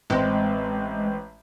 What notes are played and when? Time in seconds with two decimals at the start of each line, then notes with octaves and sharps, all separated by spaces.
0.10 A1 G#3 C4